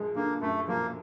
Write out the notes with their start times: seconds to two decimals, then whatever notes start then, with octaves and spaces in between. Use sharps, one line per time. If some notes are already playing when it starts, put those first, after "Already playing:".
Already playing: F#2 F3 G#3
0.15 D3 A#3
0.41 F#2 A3
0.68 F3 A#3